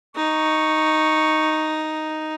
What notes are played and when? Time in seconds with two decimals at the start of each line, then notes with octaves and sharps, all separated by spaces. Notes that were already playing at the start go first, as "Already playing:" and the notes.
0.16 D#4 C#6